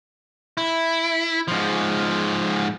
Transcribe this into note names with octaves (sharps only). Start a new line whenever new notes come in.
E4
G#2 F3